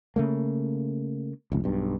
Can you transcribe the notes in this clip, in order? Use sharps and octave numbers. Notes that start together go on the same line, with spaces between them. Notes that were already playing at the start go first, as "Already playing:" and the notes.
C#3 A3 A#3
F1 C#2
B1 G2